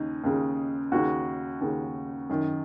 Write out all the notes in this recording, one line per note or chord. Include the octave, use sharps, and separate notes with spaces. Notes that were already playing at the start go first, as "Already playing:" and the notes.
Already playing: D#2 C#3 D#4
D#2 C#3
D#2 C#3 F#4
D#2 C#3
F#2 D#3